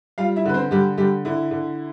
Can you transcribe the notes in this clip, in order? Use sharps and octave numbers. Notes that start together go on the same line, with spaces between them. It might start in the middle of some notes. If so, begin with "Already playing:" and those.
G3 F4 F5
E4 E5
D3 B4
C4 C5
D3 G3 G4
D3 G3 G4
D3 E4
D3